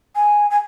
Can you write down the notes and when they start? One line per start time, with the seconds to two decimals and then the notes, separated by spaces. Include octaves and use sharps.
0.15 G#5
0.51 G#5